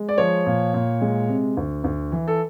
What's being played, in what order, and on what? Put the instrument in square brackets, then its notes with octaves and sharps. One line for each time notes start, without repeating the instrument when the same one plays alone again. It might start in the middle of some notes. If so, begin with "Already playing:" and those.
Already playing: [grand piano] G#3
D5
F3 C#5
A#2
A#2
G#3
C3
D2
D2
E3
A4